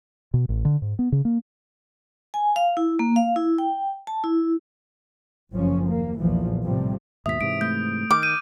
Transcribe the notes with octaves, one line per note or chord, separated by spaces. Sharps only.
B2
A1
D3
G#2
B3
C#3
A#3
G#5
F5
E4
A#3
F5
E4
G5
A5
E4
F#1 C#2 F#2 F3 C#4
D#2 A#3
B1 E2 A#2 E3 F3
A2 C3 F3 G3
D#2 G#2 B2 E5 D#6 B6
G#2 C3 E3 D7
A3 G6
D#3 D6 F6 G6
G6 D#7